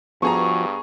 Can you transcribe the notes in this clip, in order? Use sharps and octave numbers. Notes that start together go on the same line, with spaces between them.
G2 F3 B3 F#4 G#4 A#5 C#6